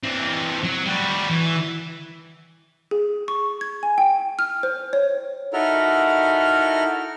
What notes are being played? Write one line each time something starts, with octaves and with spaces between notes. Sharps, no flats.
E3 C4
F#3
G3 F#4
E3
G#4
C#6
G#6
G#5
G5
F6
C5
C#5
D#4 E4 F#4 A4 A#4 F6